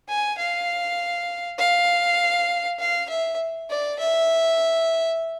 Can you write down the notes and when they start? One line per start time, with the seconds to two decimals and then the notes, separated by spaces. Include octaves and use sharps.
0.09 G#5
0.38 F5
1.59 F5
2.80 F5
3.09 E5
3.70 D5
3.99 E5